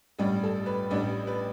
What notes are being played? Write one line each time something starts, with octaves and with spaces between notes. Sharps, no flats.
A1 G2 G3 D5
A4
B4
A1 A2 G3 D4 D5
B4